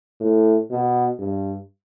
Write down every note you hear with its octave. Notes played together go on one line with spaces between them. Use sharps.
A2
B2
G2